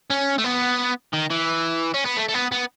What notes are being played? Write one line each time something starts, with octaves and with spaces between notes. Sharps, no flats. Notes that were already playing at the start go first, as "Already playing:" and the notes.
C#4
A3
B3
D#3
E3
C#4
B3
A3
A3
B3
B3